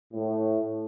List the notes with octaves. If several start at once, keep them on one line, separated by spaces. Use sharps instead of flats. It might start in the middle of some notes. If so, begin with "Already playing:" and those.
A2